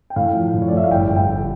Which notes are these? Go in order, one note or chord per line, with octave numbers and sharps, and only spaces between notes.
G5
A2 F5
F3
A2
C#5
D5
A2 E5
F5
G1 G5
G1
G5
G1